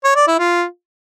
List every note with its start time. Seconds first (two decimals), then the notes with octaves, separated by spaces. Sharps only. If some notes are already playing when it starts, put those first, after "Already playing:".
0.04 C#5
0.16 D5
0.27 E4
0.39 F4